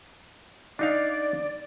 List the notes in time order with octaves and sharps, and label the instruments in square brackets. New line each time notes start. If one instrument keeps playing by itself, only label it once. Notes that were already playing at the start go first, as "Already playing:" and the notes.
[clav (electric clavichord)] D4 D#4 F5 [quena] D5